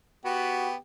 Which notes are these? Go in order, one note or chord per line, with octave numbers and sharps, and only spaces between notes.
B3 F#4 G4